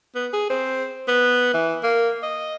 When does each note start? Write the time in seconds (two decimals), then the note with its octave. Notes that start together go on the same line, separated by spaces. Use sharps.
0.15 B3
0.33 G#4
0.50 C4
1.08 B3
1.54 E3
1.83 A#3
2.23 D#5